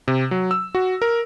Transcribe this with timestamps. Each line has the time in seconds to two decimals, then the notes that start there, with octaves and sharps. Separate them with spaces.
0.08 C3
0.31 F#3
0.51 E6
0.75 F#4
1.02 A#4